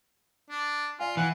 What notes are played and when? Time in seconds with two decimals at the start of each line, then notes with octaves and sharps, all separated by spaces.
0.50 D4
1.00 F4 D5 F5 G#5
1.17 E3 F#5 G#5 C7